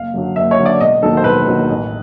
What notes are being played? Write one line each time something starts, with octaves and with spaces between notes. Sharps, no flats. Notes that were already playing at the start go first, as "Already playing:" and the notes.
Already playing: F#1 F5
F#2 D3 F#3
F#1 E5
C#5
F#2 D3 F#3
D5
E1 D#5
D#2 D#3 F#3 A4
C5
E1 B4
D#2 D#3 F#3
A1